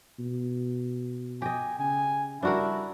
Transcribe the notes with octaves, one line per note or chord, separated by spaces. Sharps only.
B2
G4 D#5 G#5
C#3 G#5
G3 D4 E4 F#4 A#4